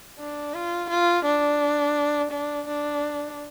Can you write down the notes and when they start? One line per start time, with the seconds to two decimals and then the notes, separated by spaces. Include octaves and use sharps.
0.19 D4
0.54 F4
0.90 F4
1.25 D4
2.32 D4
2.68 D4